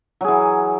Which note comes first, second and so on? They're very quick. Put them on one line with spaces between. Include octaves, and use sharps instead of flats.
F#3 G#4 E3